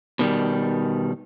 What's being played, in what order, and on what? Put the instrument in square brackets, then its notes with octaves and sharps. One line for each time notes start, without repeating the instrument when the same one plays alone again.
[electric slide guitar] B2 D#3 G3